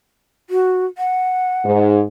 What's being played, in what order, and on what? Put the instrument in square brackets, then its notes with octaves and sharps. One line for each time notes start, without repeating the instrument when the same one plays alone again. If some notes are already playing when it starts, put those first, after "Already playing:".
[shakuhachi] F#4
F#5
[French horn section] G#2